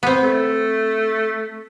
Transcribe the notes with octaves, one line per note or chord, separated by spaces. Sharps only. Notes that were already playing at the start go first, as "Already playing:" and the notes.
B3 C4
A3